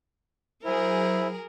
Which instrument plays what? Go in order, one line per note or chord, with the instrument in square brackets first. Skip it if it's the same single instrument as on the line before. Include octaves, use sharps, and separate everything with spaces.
[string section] F#3 G#4 [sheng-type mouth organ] E4 [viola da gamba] A#4 [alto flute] C5